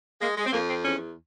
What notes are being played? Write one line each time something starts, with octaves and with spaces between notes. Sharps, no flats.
G#3 A#3
G#3
C4
F2 A#3
C4
E2 C#4